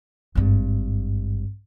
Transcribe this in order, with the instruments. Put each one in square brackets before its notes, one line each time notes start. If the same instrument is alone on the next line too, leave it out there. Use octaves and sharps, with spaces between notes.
[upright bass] G#1 G2